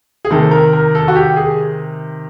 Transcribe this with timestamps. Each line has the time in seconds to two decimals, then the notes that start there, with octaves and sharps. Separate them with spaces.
0.25 G#4
0.30 C3 D#3 A4
0.51 A#4
0.73 A#4
0.95 A4
1.08 F#4
1.15 G4
1.36 G#4